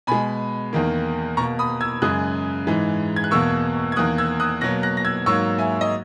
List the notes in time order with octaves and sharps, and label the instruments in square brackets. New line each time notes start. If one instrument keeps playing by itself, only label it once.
[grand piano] B2 G#3 G#5 B5
E2 D#3 A#3
B2 A#3 A#5 C#6
B5 D#6
E6 G#6
F#2 C#3 G#3 D#6 F#6
G#2 E3 G#3
G#6
F#6
E2 B2 A#3 C#6 E6
G#6
E2 D#3 A#3 D#6 F#6
E6 G#6
D#6 F#6
B2 F#3 A#3 F#6 A#6
F#6 A#6
A#6
E6 G#6
G#2 F#3 A#3 C#6 E6
E5 G#5
D#5